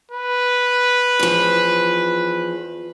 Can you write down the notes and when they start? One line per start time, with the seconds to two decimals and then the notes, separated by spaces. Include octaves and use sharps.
0.11 B4
1.19 E2 F3